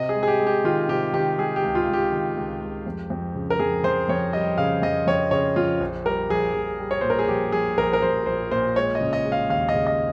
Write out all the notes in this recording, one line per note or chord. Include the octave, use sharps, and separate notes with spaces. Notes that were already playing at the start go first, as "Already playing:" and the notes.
Already playing: C3 D#5
G#4
G#3
G#4
G4
G#3
G4
D#3 F4
C3 G4
D#3 G4
G#3 G#4
G4
C#2
F4
C#2
G4
D#3
C#2
C#2
F2
F2
C#3
A#4
F2 G#4
F2 C5
F2 C#5
G3 D#5
C#3 F5
F2 D#5
F2 C#5
C#3 C#5
F2 F4
A#1
G3 A#4
A#1 G#4
A#1
G3
C#5
A#2 C5
A#4
G#4
A#1 G4
A#1 G#4
A#1 A#4
A#4
A#1 C5
A#1 C5
A#2 C5
G#3 C#5
D#5
C#3
D#5
G#3
F5
D#2 F5
D#5
C#3
D#5